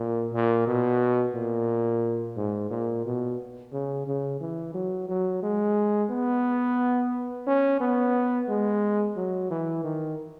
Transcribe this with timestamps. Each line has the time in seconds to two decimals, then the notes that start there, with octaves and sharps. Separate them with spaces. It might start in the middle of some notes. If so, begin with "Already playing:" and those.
Already playing: A#2
0.33 A#2
0.67 B2
1.35 A#2
2.37 G#2
2.70 A#2
3.05 B2
3.73 C#3
4.07 C#3
4.40 E3
4.74 F#3
5.08 F#3
5.42 G#3
6.10 B3
7.47 C#4
7.80 B3
8.48 G#3
9.16 F#3
9.50 E3
9.84 D#3